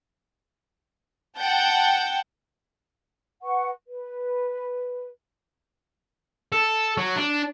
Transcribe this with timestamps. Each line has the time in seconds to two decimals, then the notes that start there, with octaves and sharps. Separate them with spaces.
1.39 F#5 G5 A5 G6
3.43 B4 F#5 C#6
3.87 B4
6.52 A4
6.98 F#3
7.16 D4